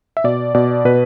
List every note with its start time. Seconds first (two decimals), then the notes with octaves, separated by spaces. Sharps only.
0.17 E5
0.24 B2 D5
0.55 B2 D5
0.85 B2 B4